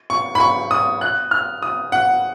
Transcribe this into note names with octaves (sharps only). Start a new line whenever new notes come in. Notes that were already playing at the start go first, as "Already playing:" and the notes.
C#6
B5
C#6
D#6
F#6
F6
D#6
F#5